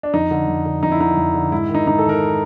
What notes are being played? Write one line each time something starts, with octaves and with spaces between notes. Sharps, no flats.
D4
F2 D#4
D3
F2
D3
F2 D#4
E4
D3 D#4
F2
D3
G#2 E4
D#3
D#4
G#2 D#4
A4
D#3
A#4